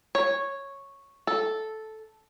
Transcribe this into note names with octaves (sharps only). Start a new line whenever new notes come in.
C#5
A4